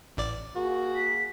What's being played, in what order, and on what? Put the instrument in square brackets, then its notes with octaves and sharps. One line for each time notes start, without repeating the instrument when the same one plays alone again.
[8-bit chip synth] A1 D5
[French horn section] A#3 G#4 [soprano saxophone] F#4
[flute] B6